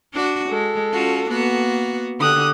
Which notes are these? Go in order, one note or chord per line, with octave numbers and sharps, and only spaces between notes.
D4 F#4
G#3 A4
C#4 F4 F#4
A#3 B3 F#4
D3 G4 D#6 F#6